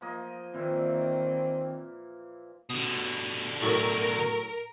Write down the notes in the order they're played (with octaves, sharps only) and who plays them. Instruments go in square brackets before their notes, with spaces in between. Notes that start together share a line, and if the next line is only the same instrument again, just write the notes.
[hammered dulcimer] F3 A#3 D#5
[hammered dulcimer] A#2 E3 E5 [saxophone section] D#3 C4
[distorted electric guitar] B2 D3 [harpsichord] D#6
[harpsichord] A2 F#3 E4 [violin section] A#4